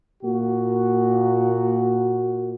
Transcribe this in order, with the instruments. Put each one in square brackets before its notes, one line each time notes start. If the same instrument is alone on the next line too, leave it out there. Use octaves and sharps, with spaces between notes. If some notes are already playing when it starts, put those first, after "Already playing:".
[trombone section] A#2 A#3 F#4